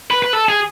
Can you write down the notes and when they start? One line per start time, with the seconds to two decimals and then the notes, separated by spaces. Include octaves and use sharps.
0.11 B4
0.22 B4
0.33 A4
0.49 G#4